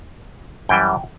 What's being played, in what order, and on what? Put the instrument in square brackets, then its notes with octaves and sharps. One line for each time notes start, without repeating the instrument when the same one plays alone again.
[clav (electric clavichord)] F#2 E3 G3 G5